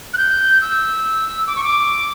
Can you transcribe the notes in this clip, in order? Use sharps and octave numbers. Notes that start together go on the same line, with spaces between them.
F#6
G6
E6
D6
C#6
D6